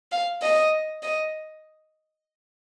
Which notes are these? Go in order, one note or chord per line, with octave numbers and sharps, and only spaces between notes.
F5
D#5
D#5